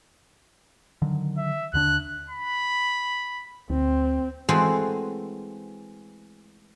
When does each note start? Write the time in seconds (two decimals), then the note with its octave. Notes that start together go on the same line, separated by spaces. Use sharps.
1.02 D3 D#3 F#3
1.37 E5
1.73 D#2 D3 D4 F#6
2.30 B5
3.70 D2 C4
4.49 E3 G#3 A3 C4 F#4 C5